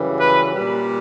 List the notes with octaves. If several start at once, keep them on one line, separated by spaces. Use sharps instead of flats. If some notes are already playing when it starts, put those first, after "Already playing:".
Already playing: F#2 C#3 E3 G3
B4
A#2 G3